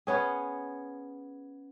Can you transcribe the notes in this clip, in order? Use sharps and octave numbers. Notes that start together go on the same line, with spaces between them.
B3 C#4 G#4